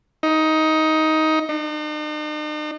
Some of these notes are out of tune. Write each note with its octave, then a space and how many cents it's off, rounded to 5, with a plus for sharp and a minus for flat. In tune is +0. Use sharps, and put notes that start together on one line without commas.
D#4 +15
D#4 -45